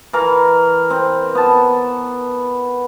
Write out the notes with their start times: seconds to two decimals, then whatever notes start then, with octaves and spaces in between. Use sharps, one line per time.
0.13 E3 A#4
0.90 C4
1.35 B3 A5